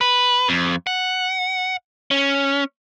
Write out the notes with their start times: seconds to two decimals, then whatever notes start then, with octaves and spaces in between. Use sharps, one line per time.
0.01 B4
0.49 F2
0.87 F#5
2.11 C#4